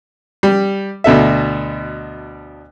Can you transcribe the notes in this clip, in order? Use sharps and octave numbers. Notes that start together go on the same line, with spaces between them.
G3
D2 B2 A4 E5